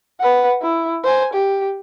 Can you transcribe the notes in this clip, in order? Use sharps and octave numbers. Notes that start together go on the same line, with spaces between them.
B4 F#5
E4
C5 G#5
G4